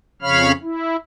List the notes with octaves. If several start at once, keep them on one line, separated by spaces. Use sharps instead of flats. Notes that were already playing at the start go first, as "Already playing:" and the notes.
F2 C#3 C#5 F5 B5 F6
E4